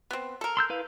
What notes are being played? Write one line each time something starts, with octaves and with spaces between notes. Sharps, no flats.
B3 C4
A4 A#4
C6 E6 G6
E4 B4 F5